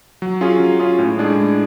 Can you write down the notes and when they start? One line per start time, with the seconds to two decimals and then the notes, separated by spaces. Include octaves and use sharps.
0.22 F#3
0.41 C#4 F4 G#4
0.60 F#3
0.79 C#4 F4 G#4
0.99 A2
1.18 G#3 D4 G#4
1.37 A2